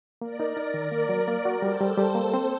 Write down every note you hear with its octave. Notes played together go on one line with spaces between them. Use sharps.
A#3 A#4 D5
D#4
D#4
D#3
A#3 A#4 D5
F#3
A#3 A#4 D5
F#4
G3 A4 C5
G3
G3
A#3
C4